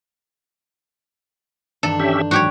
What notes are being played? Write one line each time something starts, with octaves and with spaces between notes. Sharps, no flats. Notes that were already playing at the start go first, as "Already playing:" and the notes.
G2 D#3 E3 D4 A4
C#4 G4 E5 G6
G#2 F#3 F#4 G4 C#5